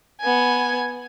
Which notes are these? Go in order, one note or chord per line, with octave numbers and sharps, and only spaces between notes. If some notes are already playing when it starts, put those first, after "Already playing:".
B3 G#5